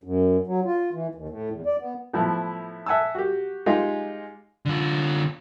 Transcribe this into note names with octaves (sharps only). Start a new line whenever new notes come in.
F#2
F#3
F4
E3
D#2
A2
E2
D5
B3
A2 F3 B3 E4
E5 F#5 G#5 A5 E6
F#4 G4
G#3 D#4 F4 G4 G#4
D3 F4